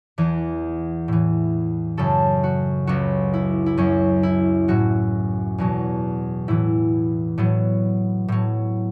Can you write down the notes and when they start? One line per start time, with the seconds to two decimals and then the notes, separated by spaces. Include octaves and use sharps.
0.18 E2 E3
1.08 A2 E3
1.97 F#2 C#3 F#3 A4
2.44 F#4
2.87 C#2 C#3 F#3 F#4
3.34 E4
3.66 E4
3.77 F#2 F#3 C#4
4.23 E4
4.68 A2 F#3 F#4
5.58 E2 B2 F#3
6.48 A2 E3 E4
7.38 A2 F#3 B3
8.28 A2 F#3